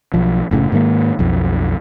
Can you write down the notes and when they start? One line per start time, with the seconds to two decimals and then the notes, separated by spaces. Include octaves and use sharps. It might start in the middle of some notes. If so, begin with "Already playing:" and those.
0.14 B1 F3
0.51 F#1 A2 C#3
0.72 G#2 D#3 A3 A#3
1.19 B1 F2